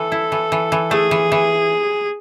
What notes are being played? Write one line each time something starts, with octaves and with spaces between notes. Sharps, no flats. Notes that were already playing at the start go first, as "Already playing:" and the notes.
Already playing: E3 A4
E4
E3
E3
E3
A3 G#4
E3
E3